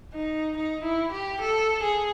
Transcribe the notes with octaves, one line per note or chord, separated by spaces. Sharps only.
D#4
D#4
E4
G4
A4
G#4